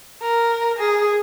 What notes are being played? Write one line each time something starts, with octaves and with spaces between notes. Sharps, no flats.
A#4
G#4